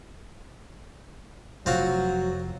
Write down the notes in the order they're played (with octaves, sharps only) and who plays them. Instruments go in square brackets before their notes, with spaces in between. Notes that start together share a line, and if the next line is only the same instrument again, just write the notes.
[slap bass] F1 [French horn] F#3 [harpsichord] C4 F4 F#4